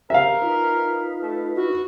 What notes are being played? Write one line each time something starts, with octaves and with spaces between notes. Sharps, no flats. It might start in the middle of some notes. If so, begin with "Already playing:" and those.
G4 A#4 E5 F5
D#4 F4 B4
A3
E4 F#4